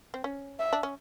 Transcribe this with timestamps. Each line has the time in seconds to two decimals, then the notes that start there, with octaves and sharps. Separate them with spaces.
0.14 C4
0.24 C#4
0.59 E5
0.73 D4
0.83 C#4